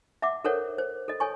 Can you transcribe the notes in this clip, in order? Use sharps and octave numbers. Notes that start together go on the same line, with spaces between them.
E5 F#5 D6
A4 A#4 C5 C#5 F#5
C5
A4 D#5
A4 C#5 G#5 C#6